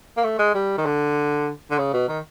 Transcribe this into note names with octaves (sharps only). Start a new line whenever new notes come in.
A#3
A3
G#3
G3
D#3
D3
D3
C#3
B2
D#3